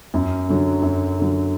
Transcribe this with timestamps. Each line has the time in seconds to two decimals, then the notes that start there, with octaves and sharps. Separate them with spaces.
0.14 F#2
0.49 D3 F#3
0.82 F#2
1.17 D3 F#3